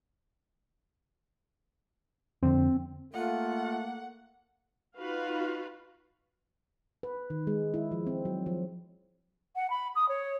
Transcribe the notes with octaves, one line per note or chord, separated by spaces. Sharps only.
F2 D3 C4
A3 A#3 F4 F#5
D#4 F4 F#4 B4 F5
B4
D#3
G#3
E4
F3
C4
F#3
F3
F#5
B5
D#6
C#5